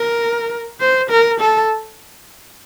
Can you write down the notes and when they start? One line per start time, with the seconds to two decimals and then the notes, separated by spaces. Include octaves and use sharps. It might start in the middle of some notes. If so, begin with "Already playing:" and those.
Already playing: A#4
0.80 C5
1.11 A#4
1.40 A4